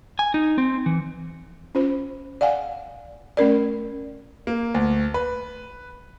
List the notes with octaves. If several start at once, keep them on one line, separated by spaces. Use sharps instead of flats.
G#5
D#4
C4
E3
C#4 F4 C5
D5 F5 F#5 G#5
A3 C#4 A#4 D5
A#3
D2
B4